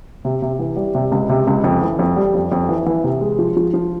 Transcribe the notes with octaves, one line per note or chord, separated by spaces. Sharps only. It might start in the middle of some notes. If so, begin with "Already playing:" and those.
C3
C3
E3
G3
C3
C#2
C3
C#2
F2
E3
F2
G3
F2
F2
E3
E3
C3
G#3
F3
F3
F3